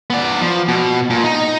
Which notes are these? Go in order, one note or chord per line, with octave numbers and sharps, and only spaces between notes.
B3 D5
F3
B2
A#2
D#4